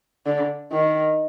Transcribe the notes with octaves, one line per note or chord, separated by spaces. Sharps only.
D3
D#3